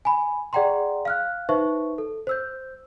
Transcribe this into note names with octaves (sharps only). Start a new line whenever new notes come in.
G#5 B5
G#4 D5 F#5 G5 A#5 C6
F5 F6 F#6
D#4 B4 C5 E5 C#6
A4
C5 E6 G6